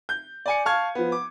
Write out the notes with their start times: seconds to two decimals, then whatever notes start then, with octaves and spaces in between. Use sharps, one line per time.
0.09 G6
0.46 D5 G#5 C#7
0.65 F5 A5 C#6 F6 G#6
0.95 F3 B3
1.12 D6